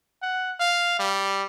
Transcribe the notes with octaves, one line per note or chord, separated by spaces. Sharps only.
F#5
F5
G3